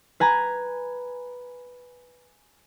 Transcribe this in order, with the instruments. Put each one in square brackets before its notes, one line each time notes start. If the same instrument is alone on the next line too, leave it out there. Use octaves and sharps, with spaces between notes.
[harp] B4 G#5 A#5